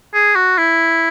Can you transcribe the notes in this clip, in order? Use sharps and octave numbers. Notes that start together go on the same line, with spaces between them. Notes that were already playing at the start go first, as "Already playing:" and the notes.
G#4
F#4
E4